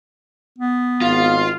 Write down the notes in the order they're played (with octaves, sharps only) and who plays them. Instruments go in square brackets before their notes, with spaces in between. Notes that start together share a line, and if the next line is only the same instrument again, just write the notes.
[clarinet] B3
[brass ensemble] G#1 F5 [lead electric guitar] F4